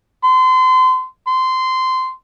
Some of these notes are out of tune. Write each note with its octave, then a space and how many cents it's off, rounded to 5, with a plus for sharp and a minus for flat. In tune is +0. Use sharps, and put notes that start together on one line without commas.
C6 -30
C6 -15